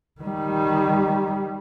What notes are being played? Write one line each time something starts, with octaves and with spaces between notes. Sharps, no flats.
D#3 G3